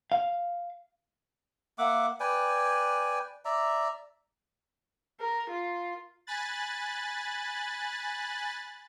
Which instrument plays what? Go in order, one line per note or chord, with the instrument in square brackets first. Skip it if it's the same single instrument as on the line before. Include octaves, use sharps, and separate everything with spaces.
[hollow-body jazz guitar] F5
[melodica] A#3 E5 F#5 D6
B4 D5 G5 G#5
D5 E5 A#5
[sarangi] A#4
F4
[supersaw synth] G#5 B5 F#6 A6